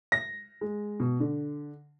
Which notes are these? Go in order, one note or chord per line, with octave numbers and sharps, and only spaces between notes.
A#6
G#3
B2
D3